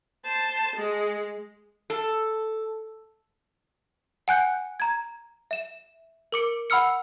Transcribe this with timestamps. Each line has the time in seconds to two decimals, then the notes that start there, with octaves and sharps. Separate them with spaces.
0.24 C5 A5
0.76 G#3
1.90 A4
4.28 F#5 G#5 F#6 G6 C#7
4.80 A#5 G#6
5.51 E5 E7
6.32 A#4 D6 C#7 D7
6.70 F#5 B5 E6 F6 C#7